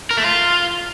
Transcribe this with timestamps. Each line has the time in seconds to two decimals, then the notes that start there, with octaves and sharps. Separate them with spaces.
0.11 A#4
0.17 A3
0.24 F4